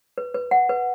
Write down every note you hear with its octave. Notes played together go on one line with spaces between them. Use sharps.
B4
B4
F#5
B4